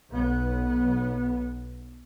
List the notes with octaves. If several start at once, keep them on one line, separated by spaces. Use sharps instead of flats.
B1 B3